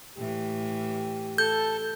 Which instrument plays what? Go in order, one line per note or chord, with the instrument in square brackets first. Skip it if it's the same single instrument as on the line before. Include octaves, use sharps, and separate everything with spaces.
[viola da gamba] A2 E3 [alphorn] G4
[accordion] A4 [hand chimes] G6